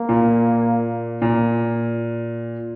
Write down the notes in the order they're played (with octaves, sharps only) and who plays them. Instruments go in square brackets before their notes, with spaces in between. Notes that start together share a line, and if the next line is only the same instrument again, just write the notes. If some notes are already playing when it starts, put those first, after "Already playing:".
Already playing: [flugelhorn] A#3
[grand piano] A#2
A#2